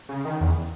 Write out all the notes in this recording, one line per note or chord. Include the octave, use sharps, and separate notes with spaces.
C#3
D#3
E2